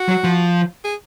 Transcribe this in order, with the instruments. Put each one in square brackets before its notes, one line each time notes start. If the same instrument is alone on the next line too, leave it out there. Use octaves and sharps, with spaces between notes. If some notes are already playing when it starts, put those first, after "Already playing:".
Already playing: [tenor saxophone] F#4
[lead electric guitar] F#3
F3
[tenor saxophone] G#4